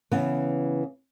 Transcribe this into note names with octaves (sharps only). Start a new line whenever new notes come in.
C#3 E3 B3